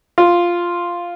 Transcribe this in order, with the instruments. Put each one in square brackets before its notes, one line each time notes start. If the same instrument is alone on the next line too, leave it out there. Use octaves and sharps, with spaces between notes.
[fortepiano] F4